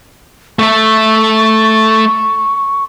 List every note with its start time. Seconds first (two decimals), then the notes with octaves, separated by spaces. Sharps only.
0.59 A3 E5 C#6